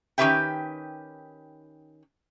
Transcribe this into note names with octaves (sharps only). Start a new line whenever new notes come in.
D#3 C#4 G4 B4 E5 G5